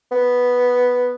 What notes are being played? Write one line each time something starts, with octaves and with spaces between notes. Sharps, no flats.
B3